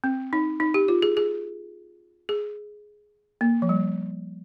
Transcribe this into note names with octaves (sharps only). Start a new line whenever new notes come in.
C4
D#4
D#4
G4
F4
G#4
G#4
G#4
A#3
F3
G3